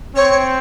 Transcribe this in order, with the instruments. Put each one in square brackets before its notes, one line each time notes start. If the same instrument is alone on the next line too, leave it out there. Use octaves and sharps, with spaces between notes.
[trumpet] C4 [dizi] C#5